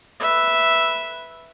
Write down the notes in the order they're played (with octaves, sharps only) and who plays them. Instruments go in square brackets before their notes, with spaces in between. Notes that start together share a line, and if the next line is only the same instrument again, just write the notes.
[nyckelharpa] B4 E5